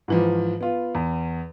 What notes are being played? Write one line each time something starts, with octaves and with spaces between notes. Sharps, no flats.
G#2 E3 F3
B3 F4
E2